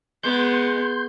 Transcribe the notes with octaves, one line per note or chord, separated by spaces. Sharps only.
G#3 B3 C6 G6